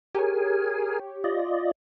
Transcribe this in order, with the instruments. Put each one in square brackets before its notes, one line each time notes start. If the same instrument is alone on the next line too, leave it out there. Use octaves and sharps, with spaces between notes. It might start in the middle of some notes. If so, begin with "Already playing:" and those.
[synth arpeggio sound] G4 C#5 [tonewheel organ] G#4 A#4 G#5
[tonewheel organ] F4 D5 D#5